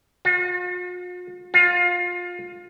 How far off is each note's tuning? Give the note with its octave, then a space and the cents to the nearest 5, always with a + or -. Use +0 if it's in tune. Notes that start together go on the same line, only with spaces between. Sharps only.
F4 +45
F4 +20